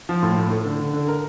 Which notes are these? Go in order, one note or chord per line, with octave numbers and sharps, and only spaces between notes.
F3
A2
A2
A3
D3
D3
D3
A#4